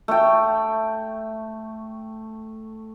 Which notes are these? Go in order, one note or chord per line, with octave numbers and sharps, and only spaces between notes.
A3 G5